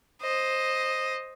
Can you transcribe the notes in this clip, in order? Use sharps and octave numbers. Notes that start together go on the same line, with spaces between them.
C5 D#5